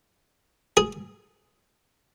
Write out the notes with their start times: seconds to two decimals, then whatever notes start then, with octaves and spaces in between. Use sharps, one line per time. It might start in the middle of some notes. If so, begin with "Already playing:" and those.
0.77 G#4